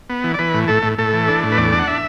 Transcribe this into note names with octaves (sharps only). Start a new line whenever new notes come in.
B3
E3
D5
E3 B4
A2
A2 A4
A2
A2 A4
E3
D4
A2
B4
E2 D5
D4
F#5
E5